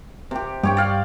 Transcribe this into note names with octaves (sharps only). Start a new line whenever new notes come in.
C3 G4
G2 G4 C#5 G5
D5 F5